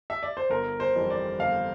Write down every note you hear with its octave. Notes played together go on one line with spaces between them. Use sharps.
E5
D5
C5
G1 A#4
C5
F2 E3 G3
D5
G1 F5